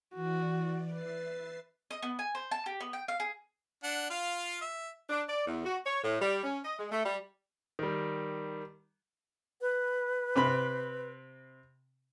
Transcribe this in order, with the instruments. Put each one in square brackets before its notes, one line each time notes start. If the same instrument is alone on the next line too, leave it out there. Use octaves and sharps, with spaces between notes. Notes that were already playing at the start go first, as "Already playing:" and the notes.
[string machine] E3 D5 [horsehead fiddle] F#4
[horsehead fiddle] B4 [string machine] E5 A6 C7
[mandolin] D#5
B3
G#5
C5
A5
G4
B3
G5
F5
G#4
[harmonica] D4 F#5
F4 F5
E5
[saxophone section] D4
D5
E2
F#4
C#5
A2
G3
C#4
D#5
G#3
A3
G3
[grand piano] D#3 G3
[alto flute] B4
[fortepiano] C3 C4 B5